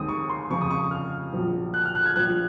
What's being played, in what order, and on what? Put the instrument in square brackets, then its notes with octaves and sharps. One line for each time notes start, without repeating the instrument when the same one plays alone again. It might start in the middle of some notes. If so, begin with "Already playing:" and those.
Already playing: [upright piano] D#2 D#3 G#3 C4 D#6
C#6
C6
F2 C#3 F3 C4 C#6
D#6
C#6
C#6
F6
A#1 A#2 F#3
F#6
F6
F#6
G#6
A#1 A#2 F3 F#6